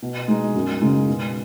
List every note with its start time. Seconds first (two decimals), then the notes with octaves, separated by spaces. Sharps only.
0.02 B2
0.28 G#3 D#4
0.55 F#2
0.81 C#3 G#3 D#4
1.08 B2